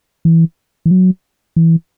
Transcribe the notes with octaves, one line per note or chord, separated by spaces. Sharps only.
E3
E3
F#3
E3